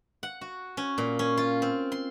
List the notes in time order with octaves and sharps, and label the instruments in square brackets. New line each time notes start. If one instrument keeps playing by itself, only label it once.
[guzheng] F#5
F#4
C#4
A#2
C#4
F4
C4
C6